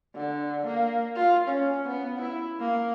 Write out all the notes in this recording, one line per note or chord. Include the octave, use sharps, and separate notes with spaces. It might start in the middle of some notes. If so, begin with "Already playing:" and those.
D3
A#3
F4
C#4
B3
E4
A#3